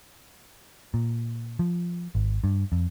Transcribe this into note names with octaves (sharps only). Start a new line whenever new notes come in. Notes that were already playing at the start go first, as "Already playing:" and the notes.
A#2
F3
G#1
G2
F2